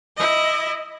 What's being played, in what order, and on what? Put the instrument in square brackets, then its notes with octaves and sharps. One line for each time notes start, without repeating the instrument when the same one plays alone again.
[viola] E4 D#5